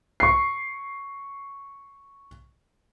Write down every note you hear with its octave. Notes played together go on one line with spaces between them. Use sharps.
C#6 C7